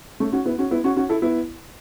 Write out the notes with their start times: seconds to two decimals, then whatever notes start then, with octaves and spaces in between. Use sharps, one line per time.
0.20 A3 C#4
0.32 C#4 F#4
0.46 B3 E4
0.58 C#4 F#4
0.71 B3 E4
0.84 C#4 F#4
0.97 C#4 F#4
1.09 E4 A4
1.22 B3 E4